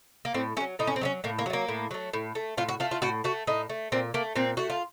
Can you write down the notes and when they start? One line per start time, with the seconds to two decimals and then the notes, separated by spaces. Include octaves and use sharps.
0.25 A#3
0.34 A2 C4
0.57 A3 C#4
0.60 F#3
0.79 A2 D#4
0.87 C#4
0.96 C4
1.01 F#3 A3 C#4
1.24 A2 A#3
1.38 A#3
1.46 F#3 A3
1.53 A#3
1.68 A2
1.91 F#3 A3
2.13 A2
2.35 A3
2.57 A2 F4
2.68 F#4
2.80 A3 F4
2.91 F4
3.02 A2 F#4
3.24 A3 F#4
3.47 A2 D#4
3.70 A3
3.92 A#2 C4
4.14 A3 A#3
4.36 A#2 C4
4.57 A3 F#4
4.70 F4